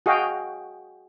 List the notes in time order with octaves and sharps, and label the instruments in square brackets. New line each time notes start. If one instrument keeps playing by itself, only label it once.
[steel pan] F#4 G#4 D#5 F5 G5